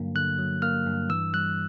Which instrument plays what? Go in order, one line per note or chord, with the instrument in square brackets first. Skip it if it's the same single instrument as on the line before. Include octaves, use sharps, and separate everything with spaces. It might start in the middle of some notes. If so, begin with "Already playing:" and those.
Already playing: [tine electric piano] G2 D3 F#3 A#3
D3 F#6
F#3
A#3 F6
G2
E3 E6
G3 F#6